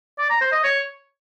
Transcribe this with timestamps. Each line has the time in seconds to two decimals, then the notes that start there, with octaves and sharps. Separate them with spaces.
0.18 D5
0.30 A#5
0.41 C5
0.52 D#5
0.64 C#5